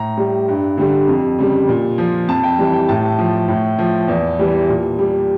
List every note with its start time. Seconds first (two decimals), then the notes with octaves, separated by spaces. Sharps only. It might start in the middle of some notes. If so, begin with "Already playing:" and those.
Already playing: A2 A#5
0.17 G3
0.48 G2
0.77 D3 G3
1.08 F2
1.39 C#3 G3
1.69 A#2
1.98 F3
2.28 F2 A5
2.44 G5
2.59 E3 G3
2.73 G5
2.89 A2 A5
3.19 F3
3.48 A2
3.79 F3
4.08 E2
4.39 E3 G3
4.69 A#2
4.99 G3